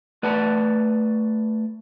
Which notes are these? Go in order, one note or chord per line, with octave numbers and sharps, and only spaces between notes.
A3 B4 D5 F#5 A5